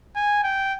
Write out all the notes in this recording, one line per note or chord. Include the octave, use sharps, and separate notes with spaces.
G#5
G5